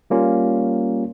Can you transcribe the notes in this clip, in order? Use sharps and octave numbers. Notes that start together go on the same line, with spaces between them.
G3 A#3 C#4 F4